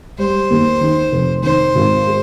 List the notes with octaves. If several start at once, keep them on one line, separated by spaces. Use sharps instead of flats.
G3 C5
D#2
D#3
F1
D#3 C5
G#1
G#3